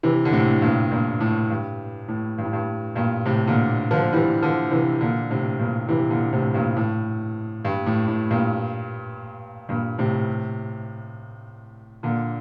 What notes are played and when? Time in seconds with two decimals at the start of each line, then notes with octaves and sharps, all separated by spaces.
0.03 C3 E3
0.25 D3
0.33 A2 C3
0.62 G2 A#2
0.91 G2 A#2
1.20 A2
1.50 G2
2.08 A2
2.38 G2
2.45 A2
2.53 G2
2.96 G2 A#2
3.26 A2 C3
3.47 A#2 D3
3.91 D3 F3
4.13 E3 G3
4.43 D3 F3
4.71 C3 E3
5.01 A#2 D3
5.30 A2 C3
5.59 G2 A#2
5.89 C3 E3
6.10 A#2 D3
6.33 A2 C3
6.54 G2 A#2
6.76 A2
7.65 G2
7.86 A2
8.08 A2
8.31 G2 A#2
9.69 G2 A#2
9.98 A2 C3
12.03 A#2 D3